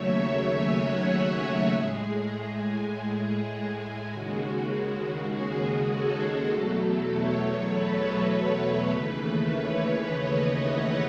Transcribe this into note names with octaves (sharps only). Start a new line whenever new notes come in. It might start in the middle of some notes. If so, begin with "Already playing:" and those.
Already playing: D#2 C#3 F#3 A3 C#5 E5
G#5
F#5
F#5
A2 G#3 G#4
G#4
G#4
D#2 C#3 G#3 F#4
G#4
A4
E2 B2 F#3 A3
C#5
B4
B4
C#5
D#2 C#3 E3 A3 B4
C#5
D#5
F#5